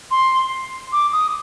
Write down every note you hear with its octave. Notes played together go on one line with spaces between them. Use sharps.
C6
D6
D#6